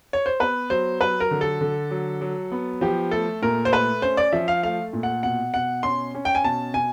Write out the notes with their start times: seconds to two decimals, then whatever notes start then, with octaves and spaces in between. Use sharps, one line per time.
0.13 C#5
0.26 C5
0.40 B3 B4
0.70 F#3 C5
1.00 F#3 B4
1.20 A#4
1.31 D3
1.41 A4
1.61 D3
1.91 F#3
2.21 F#3
2.52 B3
2.81 F3 G4
3.11 A3 A4
3.42 A#2 A#4
3.65 C5
3.72 A3 B4
4.02 C#4 C5
4.17 D5
4.32 F3 E5
4.48 F5
4.63 A3 F5
4.93 A#2
5.03 F#5
5.23 B2 F#5
5.53 B2 F#5
5.83 C#4 C6
6.14 C#4
6.25 G5
6.35 G#5
6.44 B2 A5
6.74 B2 G#5